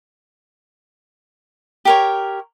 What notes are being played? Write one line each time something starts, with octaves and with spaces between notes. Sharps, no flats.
G4 A#4 C#5